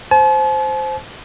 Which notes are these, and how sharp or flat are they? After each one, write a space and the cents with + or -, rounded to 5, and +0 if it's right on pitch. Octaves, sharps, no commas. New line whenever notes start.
C5 +0 A5 -45